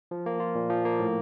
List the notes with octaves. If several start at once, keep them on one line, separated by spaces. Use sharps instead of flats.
F3
A#3
F4
A#2
F3
A#3
A2